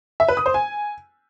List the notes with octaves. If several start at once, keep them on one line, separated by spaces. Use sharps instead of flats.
E5
B4
D#6
C5
G#5